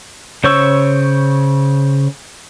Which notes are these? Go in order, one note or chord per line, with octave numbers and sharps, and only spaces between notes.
C#3 C5 C#5 C#6 E6